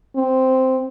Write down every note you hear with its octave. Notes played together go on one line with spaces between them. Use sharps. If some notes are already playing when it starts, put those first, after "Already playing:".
C4